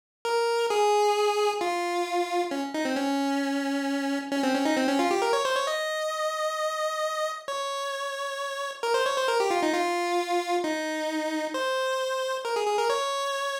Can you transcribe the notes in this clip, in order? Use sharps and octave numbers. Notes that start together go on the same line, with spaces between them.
A#4
G#4
F4
C#4
D#4
C4
C#4
C#4
C4
C#4
D#4
C4
C#4
F4
G4
A#4
C#5
C5
C#5
D#5
C#5
A#4
C5
C#5
C5
A#4
G4
F4
D#4
F4
D#4
C5
A#4
G#4
G#4
A#4
C#5